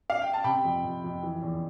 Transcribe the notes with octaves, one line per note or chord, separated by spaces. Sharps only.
F5
G5
A5
C3 G5 B5
F2
F2
F2
E3
E2